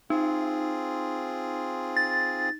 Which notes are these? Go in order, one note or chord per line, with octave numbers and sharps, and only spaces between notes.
C4 D#4 F4 G#4
A6